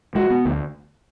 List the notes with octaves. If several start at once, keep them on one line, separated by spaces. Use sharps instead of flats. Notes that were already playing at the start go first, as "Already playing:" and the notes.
G#3 F#4
B3
D2